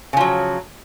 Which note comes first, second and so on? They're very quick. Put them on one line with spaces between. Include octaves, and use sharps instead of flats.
C#3 F3 F#3